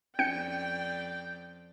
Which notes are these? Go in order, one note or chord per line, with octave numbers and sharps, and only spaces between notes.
F2 C#4 D5 G5 G6 C#7